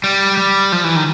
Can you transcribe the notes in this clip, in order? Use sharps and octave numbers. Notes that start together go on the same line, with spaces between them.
G3
G3
F3
E3
D#3